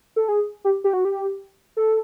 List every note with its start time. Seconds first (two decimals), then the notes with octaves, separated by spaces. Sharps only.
0.16 A4
0.28 G#4
0.65 G4
0.84 G4
0.93 F#4
1.05 G4
1.77 A4